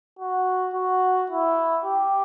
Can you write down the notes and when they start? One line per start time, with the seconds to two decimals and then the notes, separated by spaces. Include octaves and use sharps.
0.19 F#4
0.74 F#4
1.30 E4
1.85 G4